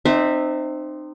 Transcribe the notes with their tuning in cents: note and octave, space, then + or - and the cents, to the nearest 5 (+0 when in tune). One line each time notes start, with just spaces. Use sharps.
C4 +0 D#4 -35 E5 -10